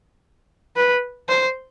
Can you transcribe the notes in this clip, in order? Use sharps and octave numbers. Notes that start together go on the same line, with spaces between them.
B4
C5